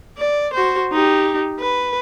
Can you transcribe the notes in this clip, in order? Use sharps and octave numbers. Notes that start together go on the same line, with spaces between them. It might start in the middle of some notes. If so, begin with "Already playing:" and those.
D5
F#4 C5
D#4 G4
B4